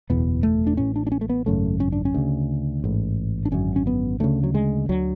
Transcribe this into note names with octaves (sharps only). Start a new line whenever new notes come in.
F#1 E2 B2 B3
A3
D4
A1 A2 C#4
D4
D4
C#4
A3
B3
G#1 F#2 C#3 A3
C#4
D4
C#4
D2 C#3
A1 G#2
D4
G#1 F#2 D3 C#4
C#4
B3
D2 C#3 A3
F#3
G#3
D2 D3 F#3